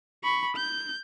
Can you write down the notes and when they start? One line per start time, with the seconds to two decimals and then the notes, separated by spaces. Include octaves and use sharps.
0.24 B5 C#6
0.57 G6